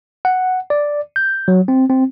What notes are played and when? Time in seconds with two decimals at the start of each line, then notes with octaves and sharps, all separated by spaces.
0.25 F#5
0.70 D5
1.16 G6
1.48 F#3
1.68 C4
1.90 C4